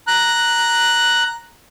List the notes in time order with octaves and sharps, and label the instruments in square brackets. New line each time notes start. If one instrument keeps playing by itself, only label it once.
[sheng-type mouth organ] A#5 F#6